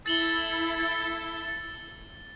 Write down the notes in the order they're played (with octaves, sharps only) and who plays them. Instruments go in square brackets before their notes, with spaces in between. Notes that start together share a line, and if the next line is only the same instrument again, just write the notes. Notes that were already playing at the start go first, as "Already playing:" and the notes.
[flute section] E4 [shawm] A4 [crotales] A6 F#7 G7